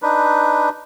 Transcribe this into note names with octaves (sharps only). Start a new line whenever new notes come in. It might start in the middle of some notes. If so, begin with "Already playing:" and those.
D4 D#4 B4